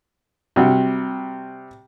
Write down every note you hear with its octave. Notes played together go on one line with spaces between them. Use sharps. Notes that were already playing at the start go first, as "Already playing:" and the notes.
C3 G3 F#4